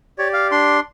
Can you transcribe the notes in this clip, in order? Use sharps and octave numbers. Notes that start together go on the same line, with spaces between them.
G4 C#5 D5
F5
D4 C6